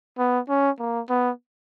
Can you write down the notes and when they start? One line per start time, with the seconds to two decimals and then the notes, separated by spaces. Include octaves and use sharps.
0.18 B3
0.49 C#4
0.79 A#3
1.09 B3